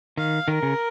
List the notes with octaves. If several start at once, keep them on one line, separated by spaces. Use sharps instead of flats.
D#3 F5
D#3 A#4
C#3